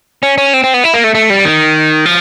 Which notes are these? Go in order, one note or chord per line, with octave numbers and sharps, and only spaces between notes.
C#4
C#4
C4
C4
B3
E4
A#3
A3
A3
G3
D#3
F3